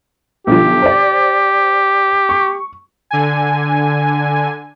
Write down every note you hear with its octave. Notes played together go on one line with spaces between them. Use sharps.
B1 D3 F3 G4
C5 D5
C#6
D3 G#5